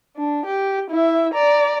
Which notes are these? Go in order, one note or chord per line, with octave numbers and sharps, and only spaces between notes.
D4
G4
E4 E5
D5 A#5